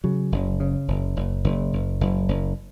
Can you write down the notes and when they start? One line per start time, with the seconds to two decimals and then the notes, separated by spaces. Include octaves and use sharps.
0.04 C#3 F#3
0.32 F#1
0.60 C#3
0.88 F#1
1.16 F#1
1.44 F#1
1.73 F#1
2.01 F#1
2.28 F#1